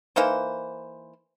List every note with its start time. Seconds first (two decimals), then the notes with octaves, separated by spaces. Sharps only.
0.16 E3 A#3 D#4 C5